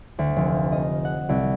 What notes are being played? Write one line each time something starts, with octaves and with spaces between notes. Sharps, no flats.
D2
F1
D#5
F#5
C2